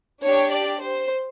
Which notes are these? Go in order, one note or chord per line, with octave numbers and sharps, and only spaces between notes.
D4 G4 C#5
D5
C5